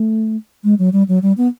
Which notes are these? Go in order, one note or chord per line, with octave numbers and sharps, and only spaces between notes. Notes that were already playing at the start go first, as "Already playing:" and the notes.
Already playing: A3
G#3
F#3
G3
F#3
G3
B3